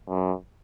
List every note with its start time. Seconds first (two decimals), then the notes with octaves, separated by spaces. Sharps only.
0.09 F#2